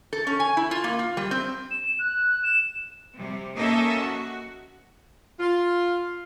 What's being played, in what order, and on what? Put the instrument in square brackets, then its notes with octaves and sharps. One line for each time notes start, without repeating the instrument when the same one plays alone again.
[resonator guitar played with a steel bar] A4
C#4
G#5
E4
F4
A#3
F4
G3
C4
[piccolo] E7
F#6
E7
[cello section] C3 G3
A#3 C#4 D#4 A4 D#5 E5
F#4
[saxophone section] F4